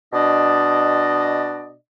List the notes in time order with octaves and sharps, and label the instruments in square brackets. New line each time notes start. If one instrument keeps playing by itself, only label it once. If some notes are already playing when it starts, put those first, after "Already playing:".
[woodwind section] B2 D4 D5 D#5